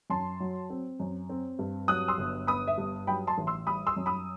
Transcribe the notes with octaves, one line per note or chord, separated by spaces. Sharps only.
F#2 A5 C6
F#3
C4
F#2
C4
G2
F#3 D#6 F#6
C6 E6
G1
B3 B5 D#6
E5
G2
F#3 G5 B5
A5 C6
A1
C6 E6
G3 B5 D#6
C6 E6
F#2
B5 D#6